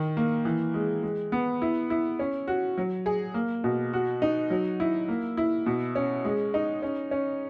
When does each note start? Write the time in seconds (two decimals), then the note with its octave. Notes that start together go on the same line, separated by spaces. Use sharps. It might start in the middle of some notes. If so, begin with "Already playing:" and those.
Already playing: D#3
0.17 A#3
0.45 E3
0.74 G#3
1.03 G#3
1.32 B3
1.62 E4
1.90 E4
2.19 C#4
2.48 F#4
2.78 F#3
3.06 G#4
3.34 A#3
3.64 B2
3.93 F#4
4.22 D#4
4.50 F#3
4.80 E4
5.08 A#3
5.37 E4
5.66 B2
5.95 C#4
6.25 G#3
6.54 D#4
6.82 C#4
7.11 C#4